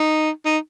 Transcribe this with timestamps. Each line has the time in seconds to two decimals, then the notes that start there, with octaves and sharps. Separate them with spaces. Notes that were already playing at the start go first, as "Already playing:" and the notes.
Already playing: D#4
0.45 D#4